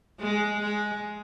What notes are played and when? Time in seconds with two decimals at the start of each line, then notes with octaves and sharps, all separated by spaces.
0.20 G#3
0.60 G#3